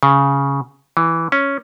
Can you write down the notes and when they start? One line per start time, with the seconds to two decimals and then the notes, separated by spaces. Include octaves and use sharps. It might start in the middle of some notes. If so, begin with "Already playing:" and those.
0.03 C#3
0.97 E3
1.32 C#4